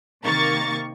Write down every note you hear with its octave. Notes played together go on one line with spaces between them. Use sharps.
C3 D#3 A#3 C#6 A6